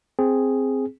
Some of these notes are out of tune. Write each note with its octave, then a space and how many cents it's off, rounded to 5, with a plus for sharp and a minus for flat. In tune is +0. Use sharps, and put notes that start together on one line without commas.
C4 +0 G#4 +0